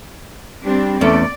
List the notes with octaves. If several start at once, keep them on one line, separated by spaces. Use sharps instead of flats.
G3 C4 D4
E2 A3 C#4 D5